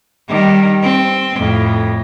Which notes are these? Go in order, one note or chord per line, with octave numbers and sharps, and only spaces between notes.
D#3 G3
C4
F2 A2